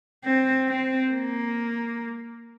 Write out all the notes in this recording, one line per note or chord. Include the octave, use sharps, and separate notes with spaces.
C4
C4
A#3